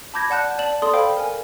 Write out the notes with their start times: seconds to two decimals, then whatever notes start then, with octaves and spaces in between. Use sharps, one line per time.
0.14 A5 B5 D6 G6 G#6 A#6
0.30 D5 F#5 A5 F#6 G6
0.58 D5 A5 F#7
0.82 A4 D5 C6 D#6
0.93 A4 C5 F5 G5 B5
1.17 A#4 G#5